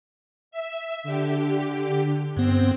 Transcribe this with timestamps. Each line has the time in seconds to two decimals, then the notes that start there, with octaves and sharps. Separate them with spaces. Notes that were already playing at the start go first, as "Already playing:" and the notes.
0.51 E5
1.04 D3 G4
2.37 G2 B3 C4